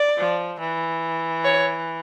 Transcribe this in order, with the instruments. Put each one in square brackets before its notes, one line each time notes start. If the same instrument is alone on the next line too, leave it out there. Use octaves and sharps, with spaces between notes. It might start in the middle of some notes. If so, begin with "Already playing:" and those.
Already playing: [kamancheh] D5
[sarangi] F3
E3
[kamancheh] C#5